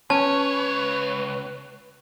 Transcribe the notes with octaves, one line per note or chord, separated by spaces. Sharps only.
C#2 C#4 B4 C#5 A5